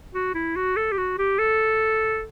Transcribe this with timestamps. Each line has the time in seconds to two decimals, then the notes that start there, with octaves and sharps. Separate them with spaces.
0.14 F#4
0.34 E4
0.56 F#4
0.76 A4
0.92 G4
0.98 F#4
1.18 G4
1.39 A4